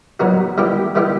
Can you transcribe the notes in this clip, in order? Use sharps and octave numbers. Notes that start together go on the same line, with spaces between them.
A#2 F#3 B3 D#4 F#4
D#3 G3 B3 E4 G4
D#3 G3 B3 E4 G4